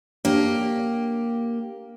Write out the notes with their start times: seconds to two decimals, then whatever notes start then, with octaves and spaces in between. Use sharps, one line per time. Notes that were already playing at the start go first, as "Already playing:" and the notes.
0.25 A#3 D4 G4 C5 C#5